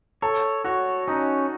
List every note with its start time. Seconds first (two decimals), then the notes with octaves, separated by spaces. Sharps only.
0.22 A4 C#5
0.64 F#4 C#5
1.07 C#4 D#4